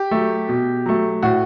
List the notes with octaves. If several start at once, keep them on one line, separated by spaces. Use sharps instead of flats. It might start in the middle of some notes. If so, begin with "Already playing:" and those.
Already playing: G4
F#3 A3
B2
F#3 A3
A2 F#4